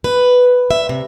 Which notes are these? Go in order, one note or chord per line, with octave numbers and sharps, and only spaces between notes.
B4
E5
C3